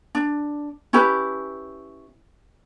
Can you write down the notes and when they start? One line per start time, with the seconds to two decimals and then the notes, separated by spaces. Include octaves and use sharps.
0.15 D4
0.93 C#4 E4 G4 B4